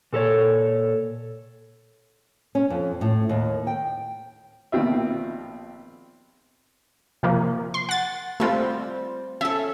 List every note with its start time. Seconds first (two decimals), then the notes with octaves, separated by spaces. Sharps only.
0.13 A#2 A4 A#4 C#5
2.55 C#4
2.70 F2
3.01 A2
3.29 D#2
3.67 G5
4.72 A#1 B2 D#3 C4 F4 E5
7.23 C3 F3 A#3
7.74 C6
7.89 F#5 A6
8.40 G3 A3 C4 F4
9.41 C#4 A4 E5